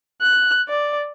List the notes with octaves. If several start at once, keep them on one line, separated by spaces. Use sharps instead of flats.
F#6
D5